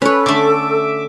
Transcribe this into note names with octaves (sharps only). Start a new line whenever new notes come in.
C#4 A4 B4 C#5
D3 A3 E5 D6